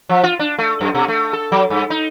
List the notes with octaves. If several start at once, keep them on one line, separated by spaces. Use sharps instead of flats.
F3
F4
D4
A3
F#2
B2
A3
A4
F#3
G2
D#4